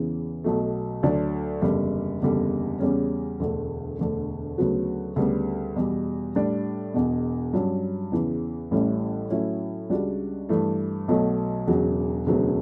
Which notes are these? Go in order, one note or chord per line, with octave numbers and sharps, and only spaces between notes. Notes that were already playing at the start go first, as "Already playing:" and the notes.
Already playing: E2 C#3 E3
B1 B2 F#3 A3
D2 D3 F#3 A3 D4
F#1 E2 D3 G3
F#1 E2 D3 G3
E2 C#3 G3 C#4
E1 D2 D3 A3
E1 D2 D3
D2 C#3 F#3 B3 F#4
D2 C#3 G3 B3
E2 B2 G3
A2 G3 D4
E1 E2 B2
G2 F#3 C#4
E2 C#3 E3
A1 A2 G3 C#4 E4
A2 F#3 C#4 E4
C#2 C#3 G3 D4 F#4
G2 E3 A3
B1 B2 F#3 A3
E1 E2 C#3 F#3
E1 D2 C#3 F#3 B3